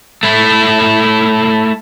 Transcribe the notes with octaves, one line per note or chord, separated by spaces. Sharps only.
A3 E4